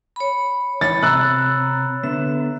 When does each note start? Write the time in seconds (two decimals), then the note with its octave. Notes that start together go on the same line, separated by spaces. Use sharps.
0.16 C#5 B5
0.81 E3 C#5 B5 A6
1.03 C3 A#5 E6 F#6
2.04 D3 B3 E5